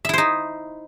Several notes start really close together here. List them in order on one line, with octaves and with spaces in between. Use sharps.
E5 E4 C5 D#4